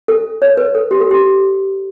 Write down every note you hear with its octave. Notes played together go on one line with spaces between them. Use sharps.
A4
C#5
B4
A4
G4
A4
G4